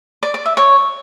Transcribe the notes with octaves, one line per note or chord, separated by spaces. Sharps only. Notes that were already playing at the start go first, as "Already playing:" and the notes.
D5
D5
E5
C#5